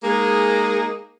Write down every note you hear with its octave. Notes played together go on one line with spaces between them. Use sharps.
G#3 A#3 D#4 G#4